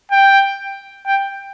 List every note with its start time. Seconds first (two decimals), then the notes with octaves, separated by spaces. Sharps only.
0.12 G5
1.06 G5